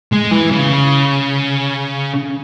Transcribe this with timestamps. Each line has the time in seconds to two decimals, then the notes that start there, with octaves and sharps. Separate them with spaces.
0.12 G#3
0.31 E3
0.51 C#3